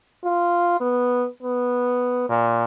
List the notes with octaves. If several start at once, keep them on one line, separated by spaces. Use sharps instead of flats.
F4
B3
B3
A#2